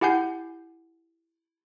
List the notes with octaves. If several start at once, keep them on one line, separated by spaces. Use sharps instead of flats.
E4 G4 F#5 G#5 G6 C7